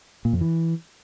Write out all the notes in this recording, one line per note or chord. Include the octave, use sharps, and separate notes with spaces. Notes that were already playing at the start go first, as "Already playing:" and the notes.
A#2
F2
E3